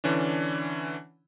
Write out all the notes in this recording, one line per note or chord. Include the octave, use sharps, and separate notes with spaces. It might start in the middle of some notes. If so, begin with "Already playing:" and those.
D3 E3 C#4 D4